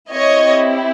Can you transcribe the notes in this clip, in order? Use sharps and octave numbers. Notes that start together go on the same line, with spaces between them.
C4 E4 G4 C#5 D#5